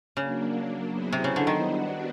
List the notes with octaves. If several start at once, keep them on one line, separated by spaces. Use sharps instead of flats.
C#3 F#3 A#3 D4
F#3 B3 E4 G#4 C5
C3
C#3
D3
D#3
G3 B3 D4 F#4